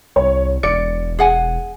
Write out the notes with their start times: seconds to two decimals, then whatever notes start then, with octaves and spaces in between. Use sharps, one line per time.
0.16 C2 C#5
0.63 E1 D5 C#7
1.19 G#4 F#5 G#5